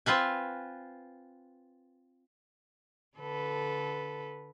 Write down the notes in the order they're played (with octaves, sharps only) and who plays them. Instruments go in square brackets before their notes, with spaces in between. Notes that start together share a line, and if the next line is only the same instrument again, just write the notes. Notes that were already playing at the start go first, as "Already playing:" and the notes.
[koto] C4 F4 B4 G#5
[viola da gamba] D3 A4 B4